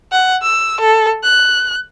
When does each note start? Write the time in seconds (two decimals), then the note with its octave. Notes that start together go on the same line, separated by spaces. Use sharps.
0.12 F#5
0.42 E6
0.80 A4
1.24 F#6